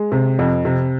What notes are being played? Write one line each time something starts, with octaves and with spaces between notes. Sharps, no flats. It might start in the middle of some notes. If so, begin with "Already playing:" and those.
Already playing: G#3
C3
F2
C3